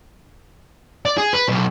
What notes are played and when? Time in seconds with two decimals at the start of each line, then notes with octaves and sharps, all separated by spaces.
1.06 D5
1.18 G#4
1.34 B4
1.49 B1